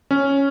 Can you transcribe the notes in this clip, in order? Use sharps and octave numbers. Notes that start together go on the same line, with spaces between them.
C#4